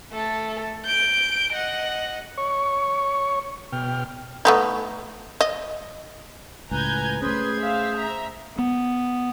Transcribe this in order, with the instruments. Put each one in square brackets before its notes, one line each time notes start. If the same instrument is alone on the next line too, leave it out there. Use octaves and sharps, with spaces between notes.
[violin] A3 A4
G6 D7
D#5 F#5
[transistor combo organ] C#5 C#6
B2 G5 F6
[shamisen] A3 B3 D#4
D#5
[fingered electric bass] C#2 A2 [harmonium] B4 G#5 [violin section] A#5 G6 G#6
[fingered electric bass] A3 C#4 [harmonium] G#4 C5 [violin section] B4 C6 G#6
[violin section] E5 F5
E5 A#5
[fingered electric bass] B3